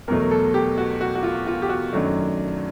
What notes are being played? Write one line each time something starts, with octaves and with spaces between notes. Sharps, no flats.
E2 B2 F#3 A3 A#4
A#4
A4
G4
F#4
F#4
F#4
F4
F4
G4
F#4
F#2 D#3 F#3 A3 D4